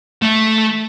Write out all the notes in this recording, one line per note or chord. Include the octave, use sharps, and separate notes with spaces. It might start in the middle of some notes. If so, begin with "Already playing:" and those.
A3 E5